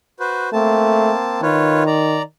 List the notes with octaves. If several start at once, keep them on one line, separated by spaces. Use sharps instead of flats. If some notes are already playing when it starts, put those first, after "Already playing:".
F#4 B4 C5
A3 A#3 C4 A5
D#3 F4 B4 C#5
D5 A#5